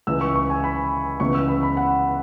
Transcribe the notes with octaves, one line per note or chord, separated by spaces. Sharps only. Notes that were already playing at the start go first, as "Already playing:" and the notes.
C#2 C#3 E3 E6
C#6
C#6
G#5
B5
C#2 C#3 E3 B3 C#6
E6
B5
B5
F#5